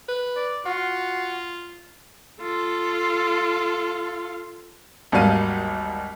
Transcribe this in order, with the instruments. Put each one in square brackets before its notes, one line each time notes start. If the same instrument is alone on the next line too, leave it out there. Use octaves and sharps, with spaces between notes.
[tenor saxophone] B4
[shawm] D5
[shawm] F4 [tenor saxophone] F#4
[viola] F4 A4
[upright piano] G#1 D#2 F#3 G3 F5 D#7